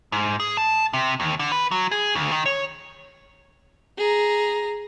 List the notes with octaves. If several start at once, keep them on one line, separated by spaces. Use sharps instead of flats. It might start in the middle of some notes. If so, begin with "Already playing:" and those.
G#2
G#4
A5
C3
D#2
D3
B4
F#3
G#4
D2
D#3
C#5
G#4 A#5